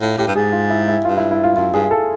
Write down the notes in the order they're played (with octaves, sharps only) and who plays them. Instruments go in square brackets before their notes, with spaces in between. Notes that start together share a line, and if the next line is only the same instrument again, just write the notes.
[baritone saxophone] A2 [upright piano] F4
[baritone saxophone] A2 [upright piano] G4
[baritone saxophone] G2
[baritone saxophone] G#2 [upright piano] G#4
[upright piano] F4
E4
E4
[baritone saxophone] G2 [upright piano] F4
[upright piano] E4
E4
F4
[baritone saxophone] F#2 [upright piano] F4
[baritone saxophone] G2 [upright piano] G#4
[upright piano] A4